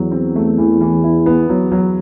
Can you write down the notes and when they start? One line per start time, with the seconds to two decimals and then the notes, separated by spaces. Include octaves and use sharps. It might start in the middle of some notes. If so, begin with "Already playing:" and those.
Already playing: E2 F#3
0.12 C4
0.36 A3
0.58 E3
0.81 E3
1.04 E4
1.26 B3
1.49 E2 F#3
1.72 F#3